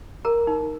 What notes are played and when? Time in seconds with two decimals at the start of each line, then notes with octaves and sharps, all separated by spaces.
0.25 A#4 A#5
0.47 D#4